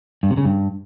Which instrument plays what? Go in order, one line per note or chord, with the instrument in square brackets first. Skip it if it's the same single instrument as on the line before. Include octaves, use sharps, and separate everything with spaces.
[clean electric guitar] G2
C3
C#3
G2